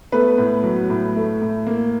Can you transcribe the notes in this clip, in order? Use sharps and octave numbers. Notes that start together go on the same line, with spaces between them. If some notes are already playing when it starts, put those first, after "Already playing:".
A3 B3 B4
A2
F#3
A2
A3
A2
A#3